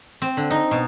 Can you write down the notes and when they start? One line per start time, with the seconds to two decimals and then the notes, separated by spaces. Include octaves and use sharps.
0.22 C4
0.37 D3
0.51 D#4
0.71 B2